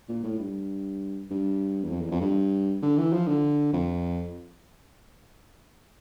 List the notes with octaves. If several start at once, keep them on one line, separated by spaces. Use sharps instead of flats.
A#2
A2
G2
G2
E2
F2
E2
F2
G2
D3
E3
F3
D3
F2